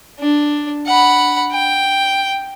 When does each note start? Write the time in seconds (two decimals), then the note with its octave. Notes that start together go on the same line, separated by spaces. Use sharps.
0.20 D4
0.87 F#5 B5
1.52 G5